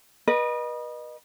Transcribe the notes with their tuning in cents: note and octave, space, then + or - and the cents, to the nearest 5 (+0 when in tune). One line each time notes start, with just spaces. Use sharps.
B4 -35 D#5 -25